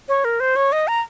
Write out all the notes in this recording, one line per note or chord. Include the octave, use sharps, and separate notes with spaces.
C#5
A#4
C5
C#5
D#5
A#5